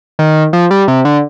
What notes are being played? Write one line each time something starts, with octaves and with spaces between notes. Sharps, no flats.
D#3
F3
G3
C3
D3